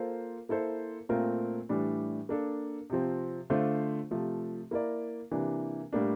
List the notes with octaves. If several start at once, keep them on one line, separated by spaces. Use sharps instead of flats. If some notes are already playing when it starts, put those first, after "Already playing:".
Already playing: A#3 F4 A4 C5
A#3 E4 A4 C5
A#2 A3 C4 F4 A#4
A2 E3 G3 D4
A#3 D4 A4
C3 F3 C4
D3 A3 D4 F4 C5
C3 F3 A3
A#3 E4 A#4 D5
C3 E3 A#3 D4
A2 G3 A#3 D4